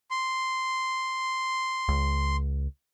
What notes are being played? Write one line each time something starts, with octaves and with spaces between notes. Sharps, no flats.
C6
C#2